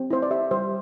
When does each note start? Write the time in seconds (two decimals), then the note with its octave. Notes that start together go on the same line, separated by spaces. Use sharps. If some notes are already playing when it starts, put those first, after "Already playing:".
Already playing: C4
0.11 E4 C5
0.22 D5
0.30 G4 E5
0.51 G3 C5